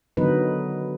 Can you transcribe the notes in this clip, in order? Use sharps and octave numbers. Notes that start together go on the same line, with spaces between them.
D3 D#3 F#3 B3 D#4 B4